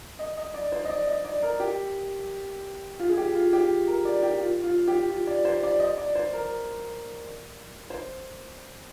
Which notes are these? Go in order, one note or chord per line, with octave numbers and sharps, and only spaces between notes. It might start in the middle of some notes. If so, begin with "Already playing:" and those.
D#5
D#5
D5
C5
D#5
D5
D#5
D5
A#4
G4
F4
G#4
G4
F4
G4
A#4
D5
G4
F4
F4
G4
F4
D5
C5
D5
D#5
D5
C5
A#4
C5